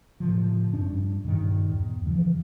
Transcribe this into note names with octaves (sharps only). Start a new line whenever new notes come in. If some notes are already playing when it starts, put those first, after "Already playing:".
A2 C#3 F3
F#2 C#4 D4
G2
G2 A#2 D#3
E2
C#3 E3 F3